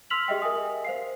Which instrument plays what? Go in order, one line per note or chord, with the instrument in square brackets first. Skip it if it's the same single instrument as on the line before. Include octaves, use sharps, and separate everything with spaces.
[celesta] C6 E6 F6 B6 F7 F#7
G4 G#4 D#5 E5 G5
A#4 E5 G#5 D#6
C5 F5 C7